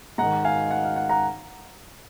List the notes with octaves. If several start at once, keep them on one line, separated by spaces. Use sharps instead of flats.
G#2 D#3 F#5 A#5
F5 G#5
F#5
F5
F#5
F#5 A#5